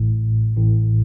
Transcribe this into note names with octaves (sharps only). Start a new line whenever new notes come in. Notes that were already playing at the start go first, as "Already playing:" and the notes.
Already playing: A1 A2
A1 A2